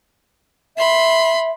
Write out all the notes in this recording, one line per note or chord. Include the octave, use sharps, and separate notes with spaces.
E5 B5 C6